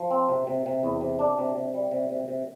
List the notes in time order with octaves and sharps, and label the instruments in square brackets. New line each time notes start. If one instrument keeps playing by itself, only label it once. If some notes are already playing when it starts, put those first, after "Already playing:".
Already playing: [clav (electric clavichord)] F3
C4
C3
C3
C3
E2
C3
D4
C3
C3
G3
C3
C3
C3